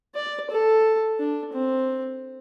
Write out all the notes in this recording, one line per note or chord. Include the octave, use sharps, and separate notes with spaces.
D5
A4
D4
C4